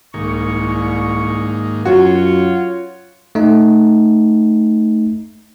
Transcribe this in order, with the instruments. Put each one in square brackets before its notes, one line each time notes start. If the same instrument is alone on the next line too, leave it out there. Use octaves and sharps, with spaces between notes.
[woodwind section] C2 C#6 [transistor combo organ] G#2 D#3 A#3
[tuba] F#2 [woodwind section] F4 C#5 [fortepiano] F#4
[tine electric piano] A3 D#4